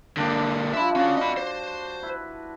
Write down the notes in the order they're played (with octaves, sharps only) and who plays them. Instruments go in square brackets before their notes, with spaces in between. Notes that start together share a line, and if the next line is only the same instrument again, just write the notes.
[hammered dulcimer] G2 D4 G5 [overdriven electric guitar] D3 A#3
[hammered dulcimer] F3 [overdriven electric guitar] E5 B5
[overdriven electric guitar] C#4 F5 [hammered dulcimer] F#4 D5
[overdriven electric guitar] D#5 B5
C5
[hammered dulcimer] E4 B4